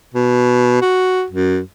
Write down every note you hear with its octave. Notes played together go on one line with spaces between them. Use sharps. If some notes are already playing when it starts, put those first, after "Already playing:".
B2
F#4
F#2